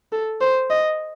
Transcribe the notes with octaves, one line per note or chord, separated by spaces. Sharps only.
A4
C5
D#5